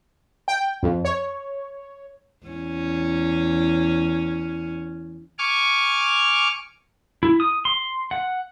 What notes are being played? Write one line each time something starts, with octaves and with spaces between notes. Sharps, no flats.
G5
F2
C#5
E2 C#4
G#5 C#6 D6 F6
E4
D#6
C6
F#5